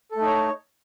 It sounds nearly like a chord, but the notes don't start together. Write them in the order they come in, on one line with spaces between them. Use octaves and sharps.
A4 A3 D#4 C#5